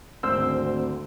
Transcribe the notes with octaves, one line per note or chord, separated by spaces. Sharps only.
G#1 D2 C4 C5 E6